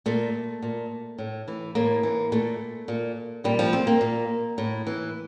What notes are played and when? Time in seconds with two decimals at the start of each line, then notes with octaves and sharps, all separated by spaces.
0.06 A#2 A3
0.63 A#2
1.18 A2
1.48 E3
1.75 A2 A#3
2.03 E3
2.32 A#2 A3
2.88 A#2
3.44 A#2 G3
3.59 F3
3.73 C4
3.87 A#3
4.01 A#2
4.58 A2
4.87 E3